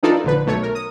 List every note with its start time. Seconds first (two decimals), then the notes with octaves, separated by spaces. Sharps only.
0.03 E3 D4 D#4 F4 A4 D5
0.24 A#1 D3 B4
0.46 B1 A3 C#5
0.63 A#4
0.75 D#6